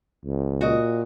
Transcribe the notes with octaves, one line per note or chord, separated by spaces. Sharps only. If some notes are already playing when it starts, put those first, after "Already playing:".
C#2
A#2 F#4 D#5